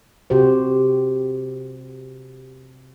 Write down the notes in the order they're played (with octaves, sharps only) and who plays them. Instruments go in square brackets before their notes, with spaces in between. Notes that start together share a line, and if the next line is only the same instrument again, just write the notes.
[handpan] C3 F#4 G4 C5